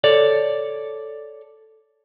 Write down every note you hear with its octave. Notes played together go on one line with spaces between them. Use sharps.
A4 C#5 D5